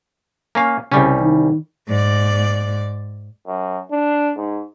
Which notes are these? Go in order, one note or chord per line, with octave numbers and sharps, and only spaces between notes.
A#3 C#4 F5
C2 C#3 G3 C#4
D#3
G#2 D5
F#2
D4
G#2